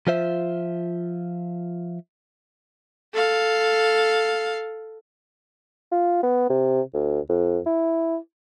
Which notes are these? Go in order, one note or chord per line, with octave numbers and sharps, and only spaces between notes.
F3 F4 C5 E5
A4 F5
F4
B3
C3
D2
F2
E4